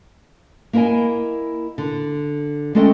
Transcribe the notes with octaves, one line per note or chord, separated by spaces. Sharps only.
A#3 E4 A#4 D#5 G#5
D3
G#3 A3 C#4 A4 D#5 G5